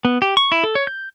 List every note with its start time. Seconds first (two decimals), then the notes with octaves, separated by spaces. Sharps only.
0.05 B3
0.22 G4
0.37 C#6
0.52 E4
0.64 A4
0.75 C#5
0.87 G6